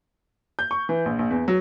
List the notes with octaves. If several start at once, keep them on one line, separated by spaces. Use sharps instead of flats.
G6
C#6
E3
A#1
A#1
E2
F#3